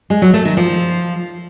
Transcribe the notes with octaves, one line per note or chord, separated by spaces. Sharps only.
G#3
F#3
A3
D#3
F3